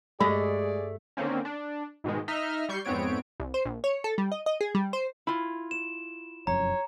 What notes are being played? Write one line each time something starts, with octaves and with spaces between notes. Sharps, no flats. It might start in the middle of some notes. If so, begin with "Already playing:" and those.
G2 G#3 A3 G#4 D5
D3 D#3 A#3 C4 C#4
D4
G#2 B2 D#3 G#3
D#4 D#5 E5 F6
G3 C#6 G6 C7
F2 G#2 B3 C4 C#5 D7
C2
C5
A#1
C#5
A4
G3
D#5
D#5
G#4
G3
C5
E4 F4
E7
F1 F#2 C#5 A#5